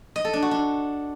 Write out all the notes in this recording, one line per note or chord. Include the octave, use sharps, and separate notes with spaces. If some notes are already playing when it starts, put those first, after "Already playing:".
D#5
A4
D4
F#4
D4